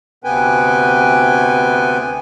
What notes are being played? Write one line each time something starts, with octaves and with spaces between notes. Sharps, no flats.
D2 C3 B3 B4 G5 G#5